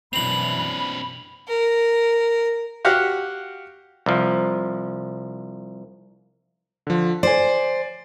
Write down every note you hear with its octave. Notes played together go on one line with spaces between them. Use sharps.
F#2 B2 E3 C4 D4 B5 F7 F#7
A#4
F#4 G4 F5 F#5
C2 F3
D3 F3
C5 D5 G#5